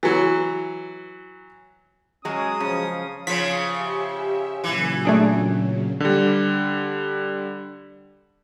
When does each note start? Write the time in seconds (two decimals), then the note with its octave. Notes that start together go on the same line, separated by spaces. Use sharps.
0.03 E3 F#3
2.25 F#3 G#3 C#4 D#6
2.60 C#3 F3
3.27 C#3 F3 B6
3.71 G4 E5
4.64 A#2 C#3 E3 F#3
5.05 A3 D4 G#4
6.00 D3 G3